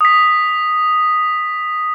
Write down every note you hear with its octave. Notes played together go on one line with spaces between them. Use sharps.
D#6 B6